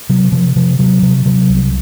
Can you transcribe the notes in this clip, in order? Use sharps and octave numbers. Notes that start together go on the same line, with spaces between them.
C3 F#3
C3 F3
C3 F3
C3 F#3
C3
C3 F#3
C2